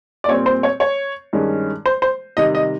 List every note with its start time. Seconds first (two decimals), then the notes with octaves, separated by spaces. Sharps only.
0.24 D5
0.28 A#2 G3 C4 C#5
0.46 C5
0.63 C#5
0.80 C#5
1.33 G2 D#3 G#3 C#4
1.86 C5
2.02 C5
2.37 C3 D#3 G3 D#5
2.55 D#5